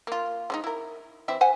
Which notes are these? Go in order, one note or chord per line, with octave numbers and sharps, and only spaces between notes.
A#3 F4
G#3 C#4 D#4
E4 A#4
E3 C4 E5
C5 F#5 G#5